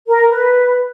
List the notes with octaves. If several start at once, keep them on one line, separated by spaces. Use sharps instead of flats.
A#4
B4